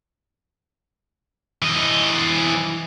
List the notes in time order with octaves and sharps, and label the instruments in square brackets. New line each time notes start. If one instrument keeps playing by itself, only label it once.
[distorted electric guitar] E3 D#5